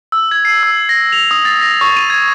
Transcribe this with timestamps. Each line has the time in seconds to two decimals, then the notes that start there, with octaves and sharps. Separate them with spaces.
0.12 E6
0.31 G#6
0.45 C7
0.63 E6
0.89 A#6
1.12 F7
1.31 D#6
1.45 A6
1.61 A#6
1.81 C#6
1.97 D#7
2.10 G#6